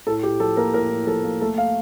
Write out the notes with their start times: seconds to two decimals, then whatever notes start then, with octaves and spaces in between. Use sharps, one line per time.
0.07 A2 A4
0.23 A2 G4
0.40 F3 A4
0.57 A#3 A#4
0.74 A2 A#4
0.90 A2
1.07 F3 A4
1.24 A#3
1.41 A3 A4
1.58 F5